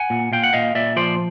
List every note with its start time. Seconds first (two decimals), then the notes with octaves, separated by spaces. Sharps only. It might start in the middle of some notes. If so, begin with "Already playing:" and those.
Already playing: F#5 G#5
0.10 A#2
0.32 A#2 F5 G5
0.43 F#5
0.53 A#2 D#5 F5
0.75 A#2 D5 E5
0.96 F3 C5 D5